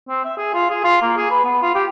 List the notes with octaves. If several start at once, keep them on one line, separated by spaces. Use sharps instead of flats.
C4
E5
G#4
F4
G#4
F4
A#3
G#4
B4
B3
F4
G4